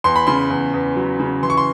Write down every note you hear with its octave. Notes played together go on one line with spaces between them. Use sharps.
E2 C6
B5
C#3 C6
E2
E2
F#3
C#3
E3 C6
C#6
C6